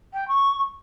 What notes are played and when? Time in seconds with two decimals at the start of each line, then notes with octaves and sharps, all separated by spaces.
0.14 G5
0.28 C#6